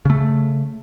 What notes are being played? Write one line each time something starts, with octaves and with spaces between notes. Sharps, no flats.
C#3 A3